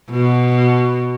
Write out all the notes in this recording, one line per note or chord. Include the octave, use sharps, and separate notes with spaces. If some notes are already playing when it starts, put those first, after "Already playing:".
B2